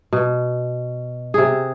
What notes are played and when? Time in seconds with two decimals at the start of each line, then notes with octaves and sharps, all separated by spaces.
0.13 B2
1.34 C3 G#4